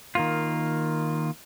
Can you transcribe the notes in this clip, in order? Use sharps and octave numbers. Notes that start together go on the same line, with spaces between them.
D#3 A#3 F4